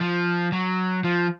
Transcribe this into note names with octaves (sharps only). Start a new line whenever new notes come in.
F3
F#3
F3